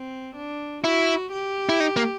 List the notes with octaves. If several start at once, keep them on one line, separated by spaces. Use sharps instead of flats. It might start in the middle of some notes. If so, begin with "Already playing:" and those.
Already playing: C4
D4
E4 F#4
G4
E4
D#4
A#3